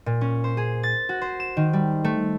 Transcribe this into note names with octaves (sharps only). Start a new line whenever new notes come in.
A#2
C#4
C5
G#4
A6
F#4
C5
E7
D#3
G3
A3